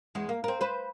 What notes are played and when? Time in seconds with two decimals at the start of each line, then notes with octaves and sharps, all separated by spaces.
0.15 E2 G#3
0.29 A#3
0.44 C4 A#4
0.61 B4 C5